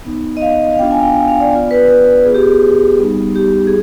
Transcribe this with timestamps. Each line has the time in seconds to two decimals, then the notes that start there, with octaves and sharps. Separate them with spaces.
0.05 B3 D#4
0.37 D#5
0.42 F5
0.73 F5
0.79 B3 D4 F4 G5
0.91 G#5
0.99 F5
1.03 G5
1.16 F5
1.28 F5
1.40 D5
1.52 B3 D5
1.55 F4
1.71 B4
1.88 B4
2.25 B3 F4 G#4
2.34 G4
2.42 G#4
2.99 G3 B3 D#4
3.36 G4
3.67 G#4